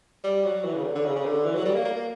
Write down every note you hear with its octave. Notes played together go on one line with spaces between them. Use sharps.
G3
F#3
E3
C#3
D3
D3
C#3
C#3
D3
E3
F#3
G3
A#3
A#3
A#3